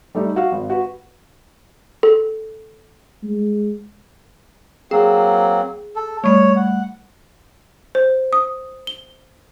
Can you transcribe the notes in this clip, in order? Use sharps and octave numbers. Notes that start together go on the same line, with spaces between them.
G3 A3 D#4
F#4 F5
G#1
F#4 B4
A4
G#3
F#3 A#3 C4 G#4
A4
G3 A3 C#5
F#5
C5
D#6
G7